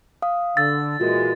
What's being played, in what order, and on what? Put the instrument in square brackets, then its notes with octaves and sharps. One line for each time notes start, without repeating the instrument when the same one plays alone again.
[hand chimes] F5 D#6
[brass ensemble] D3 [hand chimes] E6 [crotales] A6
[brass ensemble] A#2 E3 G#3 [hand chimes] F4 F#4 A#4